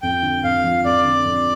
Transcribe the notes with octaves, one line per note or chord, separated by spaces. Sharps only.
F2 G5
D3
F2 F5
F3
F2 D5
D3
F2